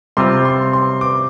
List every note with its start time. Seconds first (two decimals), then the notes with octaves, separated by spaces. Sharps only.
0.17 C3 G3 C4 F4 C6
0.45 C6
0.73 C6
1.01 D6